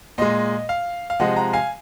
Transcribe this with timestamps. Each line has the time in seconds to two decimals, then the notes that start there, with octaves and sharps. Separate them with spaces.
0.18 A#2 G#3 D#5
0.69 F5
1.10 F5
1.20 C3 F3 G#3 D#5 F#5
1.36 F#5 A#5
1.53 F5 G#5